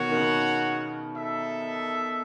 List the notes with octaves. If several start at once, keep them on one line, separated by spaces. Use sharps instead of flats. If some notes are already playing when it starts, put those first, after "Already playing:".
Already playing: B2 D#3 F#4 C#5 F#5
D#3
C#3
D#4 A4 E5